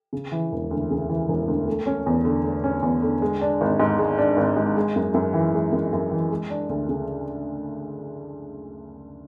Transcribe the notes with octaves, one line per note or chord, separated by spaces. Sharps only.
C#3
E3
E1
D2
C#3
E3
E1
D2
A3
C#4
E2
D3
A3
C#4
E2
D3
G#3
D4
G#1
G#2
G#3
D4
G#1
G#2
G#3
F#2
F#2
E3
G#3
F#2
F#2
E3
G#3
D4
D2
C#3